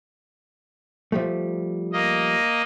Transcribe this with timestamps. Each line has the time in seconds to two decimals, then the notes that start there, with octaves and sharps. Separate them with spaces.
1.12 F3 G3 A3
1.93 A#3 D#5